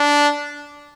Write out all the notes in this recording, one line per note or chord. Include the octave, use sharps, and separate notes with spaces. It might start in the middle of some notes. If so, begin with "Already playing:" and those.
Already playing: D4